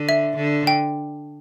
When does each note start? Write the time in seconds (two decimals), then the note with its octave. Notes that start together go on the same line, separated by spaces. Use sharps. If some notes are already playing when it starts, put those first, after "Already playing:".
Already playing: D3
0.09 E5
0.37 D3
0.67 G5